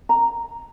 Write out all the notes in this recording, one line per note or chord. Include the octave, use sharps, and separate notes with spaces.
A#5